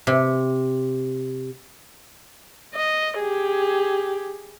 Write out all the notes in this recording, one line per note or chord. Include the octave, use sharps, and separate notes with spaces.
C3
D#5
G4 G#4